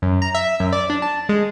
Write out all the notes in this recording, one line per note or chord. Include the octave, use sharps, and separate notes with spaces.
F#2
A#5
E5
F#2
D5
D4
A5
G#3